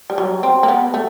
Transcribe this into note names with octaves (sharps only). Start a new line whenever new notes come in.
G3
F#3
C4
A#3
B3
A3